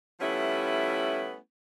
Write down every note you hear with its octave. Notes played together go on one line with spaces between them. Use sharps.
F3 G3 A3 B3 C#4 E4